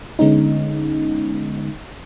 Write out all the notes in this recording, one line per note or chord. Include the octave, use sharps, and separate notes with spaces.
D3 G#3 B3 C#4 D#4